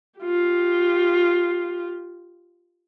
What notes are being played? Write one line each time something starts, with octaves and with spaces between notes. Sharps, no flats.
F4 G4